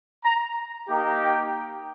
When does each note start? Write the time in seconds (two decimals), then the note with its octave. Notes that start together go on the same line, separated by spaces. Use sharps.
0.24 A#5
0.88 A#3 D#4 G4
1.20 G5